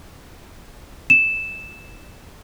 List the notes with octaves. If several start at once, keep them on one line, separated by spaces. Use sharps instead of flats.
E7